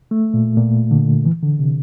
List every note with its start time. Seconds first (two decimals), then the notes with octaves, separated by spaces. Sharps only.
0.11 A3
0.34 A#2
0.57 A#2
0.91 D3
1.25 E3
1.43 D3
1.59 C3